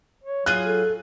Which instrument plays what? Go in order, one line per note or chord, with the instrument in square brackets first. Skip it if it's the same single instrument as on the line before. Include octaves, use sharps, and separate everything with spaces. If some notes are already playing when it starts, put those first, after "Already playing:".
[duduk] C#5
[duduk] F#3 [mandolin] F4 G#4 G#5 [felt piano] F#6
[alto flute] A4